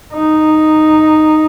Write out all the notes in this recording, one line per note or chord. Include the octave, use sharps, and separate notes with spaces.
D#4